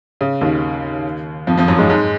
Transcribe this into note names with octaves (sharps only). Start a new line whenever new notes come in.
C#3
D#2 D#3
F2 F3
F2 F3
F#2 F#3
G#2 G#3
G#2 G#3